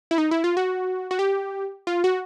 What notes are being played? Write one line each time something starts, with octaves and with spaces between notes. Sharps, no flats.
E4
D#4
E4
F4
F#4
F#4
G4
F4
F#4